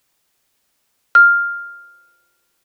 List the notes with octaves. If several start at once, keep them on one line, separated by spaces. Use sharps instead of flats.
F6